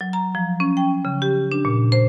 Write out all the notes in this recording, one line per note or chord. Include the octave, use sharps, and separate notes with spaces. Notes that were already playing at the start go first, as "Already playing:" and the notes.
F#3
A#5
F3
C#4
G5
C#3
G4
D4
A#2
C5